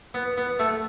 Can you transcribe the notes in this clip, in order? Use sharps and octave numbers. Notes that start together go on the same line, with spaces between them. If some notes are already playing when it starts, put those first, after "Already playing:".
B3
B3
A3